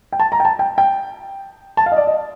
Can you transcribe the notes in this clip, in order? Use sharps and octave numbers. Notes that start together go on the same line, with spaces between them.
G5
A5
A#5
G5
A5
G5
G5
A5
F5
D#5
D5
D#5